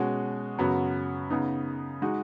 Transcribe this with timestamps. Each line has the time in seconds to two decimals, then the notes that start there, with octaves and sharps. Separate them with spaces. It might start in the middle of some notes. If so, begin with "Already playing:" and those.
Already playing: B2 G#3 C#4 F#4
0.59 F#2 C#3 F#3 B3 F#4
1.30 C#3 B3 D#4
2.02 G#3 D#4 F#4